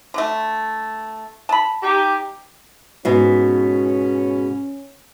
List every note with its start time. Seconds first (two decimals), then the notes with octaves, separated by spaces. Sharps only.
0.14 D3 A3
1.49 A5 B5
1.83 D#4 G4
3.05 G#2 B2 C#4